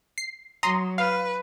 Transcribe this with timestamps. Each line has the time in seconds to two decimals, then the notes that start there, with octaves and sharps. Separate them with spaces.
0.18 C7
0.63 F#3 A#5 C6 D#6
0.98 B4 F5